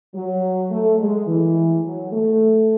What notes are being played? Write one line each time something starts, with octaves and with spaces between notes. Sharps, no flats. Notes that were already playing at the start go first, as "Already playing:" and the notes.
F#3
A3
G#3
E3
F#3
A3